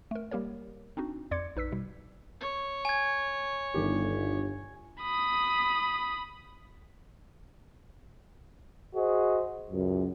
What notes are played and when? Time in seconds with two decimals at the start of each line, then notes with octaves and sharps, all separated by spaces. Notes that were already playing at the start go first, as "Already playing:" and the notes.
0.11 A3 A#4
0.31 G3 A#3 G4 A#4 C#5
0.97 C4 D4 D#4 F#4
1.31 F2 D5 C6 D6 G#6 C#7
1.56 A#1 D#4 B4 E6 B6
1.72 B2 G3
2.40 C#5
2.85 G#5 G#6
3.74 G1 D#3 G4
5.01 B5 D#6
8.94 F#4 G#4 C5 D#5
9.71 C#2 F#2